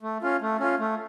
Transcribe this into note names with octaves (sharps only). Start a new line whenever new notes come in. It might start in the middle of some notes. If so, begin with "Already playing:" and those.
A3
C#4 F4
A3
C#4 F4
A3